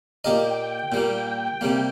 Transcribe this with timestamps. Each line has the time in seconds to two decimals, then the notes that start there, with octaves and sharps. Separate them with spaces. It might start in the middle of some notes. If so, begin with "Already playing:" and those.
0.24 A#2 A#3 G4 A#4 D#5 G5
0.92 A#2 G3 A#3 G5
1.61 C3 G3 A#3